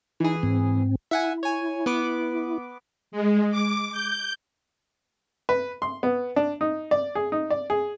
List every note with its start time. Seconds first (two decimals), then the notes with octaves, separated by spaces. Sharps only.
0.20 E3 D#4 E4 G#4
0.43 G#2 C4
1.11 E4 E5 F#5 G#5
1.43 C#5 G#5
1.86 B3 B4 D6
3.12 G#3
3.51 D6
3.92 G6
5.49 B4
5.82 C6
6.03 B3
6.36 D4
6.61 D#4
6.91 D5
7.15 G#4
7.32 D#4
7.50 D5
7.70 G#4